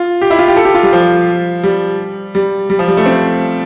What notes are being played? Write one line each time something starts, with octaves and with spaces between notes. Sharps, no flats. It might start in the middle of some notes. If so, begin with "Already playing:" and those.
Already playing: F4
G4
E4
F4
G4
A4
G4
F4
G3
F3
G3
G3
G3
F3
G3
A3
C4